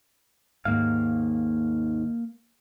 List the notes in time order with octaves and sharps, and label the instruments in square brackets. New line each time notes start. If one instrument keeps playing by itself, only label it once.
[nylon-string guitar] D#2 G#2 [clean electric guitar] A#3 F5